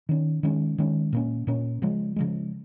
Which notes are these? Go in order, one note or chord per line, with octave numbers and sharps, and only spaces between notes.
D#3 C#4
D#3 G#3 C#4
D#3 G#3 C#4
A#2 A#3 C#4
A#2 A#3 C#4
C#3 F3 G#3
C#3 F3 G#3